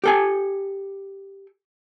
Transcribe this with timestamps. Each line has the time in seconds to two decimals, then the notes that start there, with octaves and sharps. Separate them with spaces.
0.04 G4 A4 G#5